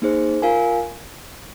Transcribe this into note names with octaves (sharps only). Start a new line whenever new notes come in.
A#3 D#4 G#4 C5
F4 A#4 F5 G#5